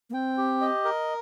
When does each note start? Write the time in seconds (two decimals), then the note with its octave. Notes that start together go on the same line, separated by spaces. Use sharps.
0.10 A#3
0.13 C4 G5
0.38 G4
0.61 D#5
0.84 A#4